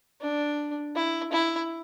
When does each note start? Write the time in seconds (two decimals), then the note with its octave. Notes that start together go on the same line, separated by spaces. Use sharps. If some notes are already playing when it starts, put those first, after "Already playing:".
0.21 D4
0.95 E4
1.32 E4